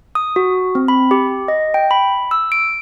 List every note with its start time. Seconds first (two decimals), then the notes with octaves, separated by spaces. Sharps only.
0.15 D#6
0.36 F#4
0.75 C4
0.88 B5
1.11 G4
1.48 D#5
1.74 G5
1.91 B5
2.31 E6
2.52 D7